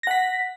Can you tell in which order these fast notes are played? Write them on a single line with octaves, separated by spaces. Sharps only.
A#6 F#5 B6